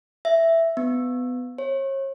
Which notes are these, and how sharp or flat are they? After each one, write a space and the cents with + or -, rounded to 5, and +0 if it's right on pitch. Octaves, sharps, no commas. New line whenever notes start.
E5 +5
B3 +20
C#5 -40